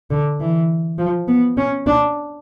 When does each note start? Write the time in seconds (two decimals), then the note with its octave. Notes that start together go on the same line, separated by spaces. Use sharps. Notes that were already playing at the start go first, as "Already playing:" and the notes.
0.11 D3
0.40 E3
0.98 F3
1.28 B3
1.57 C#4
1.86 D4